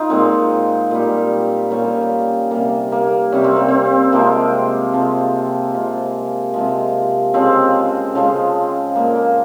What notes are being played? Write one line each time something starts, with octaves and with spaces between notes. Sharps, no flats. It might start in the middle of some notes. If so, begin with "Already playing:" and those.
Already playing: D#4 F4 A#4
A#2 G#3 C4
A#2 G3
A#2 G3 A#3 C#4
C3 G3 A#3
A#3
C3 G3 C#4
C4
A#3
C4
C3 F3 G#3 A#3
C3 F3 G#3
C3 F3 G#3
C3 F3 G#3
C#3 F3 G#3 C4
C#3 F3 G#3
A#2 G#3 A#3
A#3